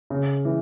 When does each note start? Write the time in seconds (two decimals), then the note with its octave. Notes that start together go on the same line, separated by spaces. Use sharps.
0.10 C#3
0.45 E3